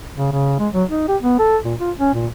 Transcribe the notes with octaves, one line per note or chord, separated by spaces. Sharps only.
C#3
C#3
G#3
F#3
D#4
G4
B3
A4
A#2
F4
C#4
A#2